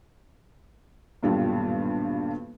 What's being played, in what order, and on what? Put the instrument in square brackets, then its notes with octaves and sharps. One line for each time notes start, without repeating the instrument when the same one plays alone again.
[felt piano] D#1 B1 G2 G3 F4